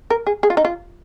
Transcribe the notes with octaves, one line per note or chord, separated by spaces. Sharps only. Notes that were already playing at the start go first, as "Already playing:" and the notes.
A#4
G#4
G#4
F4
D#4
F4